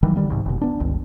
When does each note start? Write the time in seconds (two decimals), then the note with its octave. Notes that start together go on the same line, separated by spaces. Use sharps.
0.03 D#3 E3 F#3 G3
0.16 D3 D#3 G3 A#3
0.30 C2 G#2
0.46 F1 B2
0.62 B3 D4
0.80 G1 C#2 D#3